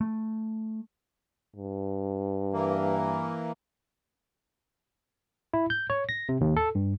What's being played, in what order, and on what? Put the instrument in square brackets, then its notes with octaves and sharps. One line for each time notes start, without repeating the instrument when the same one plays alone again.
[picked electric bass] A3
[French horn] G2
[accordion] E3 A#3
[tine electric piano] E4
G6
C#5
A#6
C3
D#2
A4
G2